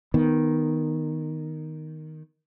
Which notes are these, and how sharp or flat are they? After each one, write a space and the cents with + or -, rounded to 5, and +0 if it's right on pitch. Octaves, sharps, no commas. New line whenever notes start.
D#3 +0 B3 +0